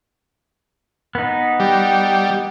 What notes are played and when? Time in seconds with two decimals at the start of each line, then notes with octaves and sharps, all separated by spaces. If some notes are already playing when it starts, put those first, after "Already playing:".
1.15 B3 D#4
1.60 G3